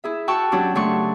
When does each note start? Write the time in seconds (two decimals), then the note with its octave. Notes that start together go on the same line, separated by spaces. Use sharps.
0.04 E4 G#4 E5
0.28 F#4 G5 A5 C#6 E6 F#6
0.52 F#3 C#4 D4 F#4 G4
0.75 C#3 F#3 A3 D4 C6 C#6